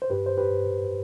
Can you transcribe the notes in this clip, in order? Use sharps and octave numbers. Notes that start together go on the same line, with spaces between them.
C5
G2 G4 B4
C5
G4 B4
G2